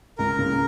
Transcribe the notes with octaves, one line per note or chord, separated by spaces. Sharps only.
C#2 A#4
C#3 A#3